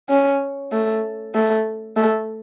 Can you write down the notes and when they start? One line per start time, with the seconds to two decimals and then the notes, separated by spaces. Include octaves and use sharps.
0.09 C#4
0.72 A3
1.35 A3
1.97 A3